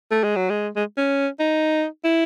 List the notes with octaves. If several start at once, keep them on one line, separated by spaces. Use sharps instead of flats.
A3
G#3
F#3
G#3
G#3
C#4
D#4
E4